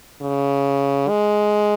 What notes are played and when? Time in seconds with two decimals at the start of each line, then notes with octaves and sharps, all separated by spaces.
0.21 C#3
1.09 G#3